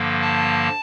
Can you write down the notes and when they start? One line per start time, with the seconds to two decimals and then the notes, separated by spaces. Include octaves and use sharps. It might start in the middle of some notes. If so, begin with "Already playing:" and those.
Already playing: G2 D3 F3 A#3
0.21 A5